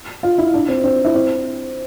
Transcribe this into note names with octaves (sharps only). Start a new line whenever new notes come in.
F4
E4
D4
C4
C4
E4
C4